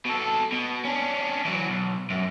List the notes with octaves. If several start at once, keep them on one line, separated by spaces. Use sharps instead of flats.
B2 A4
B2
C#4 D4
E3 F#3
B1
F#2